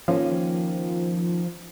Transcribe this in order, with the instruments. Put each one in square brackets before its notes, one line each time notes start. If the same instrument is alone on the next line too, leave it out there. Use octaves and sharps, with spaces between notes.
[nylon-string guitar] D#3 A#3 C#4 [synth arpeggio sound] F3